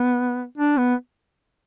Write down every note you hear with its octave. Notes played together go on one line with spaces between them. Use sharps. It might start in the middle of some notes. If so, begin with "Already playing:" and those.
Already playing: B3
D4
B3